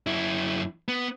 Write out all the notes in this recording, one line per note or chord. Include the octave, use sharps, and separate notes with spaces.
F#2 E4
B3